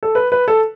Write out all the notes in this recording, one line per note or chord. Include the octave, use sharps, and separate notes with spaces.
A4
B4
B4
A4